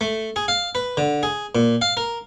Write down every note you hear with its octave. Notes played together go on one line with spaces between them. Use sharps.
A3
G#4
F5
B4
D3
G#4
A#2
F5
A#4